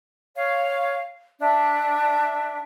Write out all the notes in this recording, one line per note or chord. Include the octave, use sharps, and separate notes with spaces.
C#5 F5
D4 E5